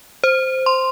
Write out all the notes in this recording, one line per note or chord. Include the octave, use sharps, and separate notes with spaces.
C5
C6